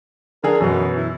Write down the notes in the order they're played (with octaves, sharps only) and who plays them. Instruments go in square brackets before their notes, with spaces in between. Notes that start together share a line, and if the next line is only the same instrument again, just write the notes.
[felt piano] D3 G#4 [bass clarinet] A#4
[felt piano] F#2 B2 [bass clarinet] E3
[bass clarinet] E4